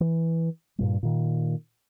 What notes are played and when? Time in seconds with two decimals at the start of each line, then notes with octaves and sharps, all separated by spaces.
0.01 E3
0.78 G2 A#2 G3
1.03 A#2 D#3